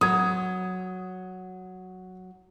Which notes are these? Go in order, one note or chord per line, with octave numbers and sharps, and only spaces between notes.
F#3 D#6 G#6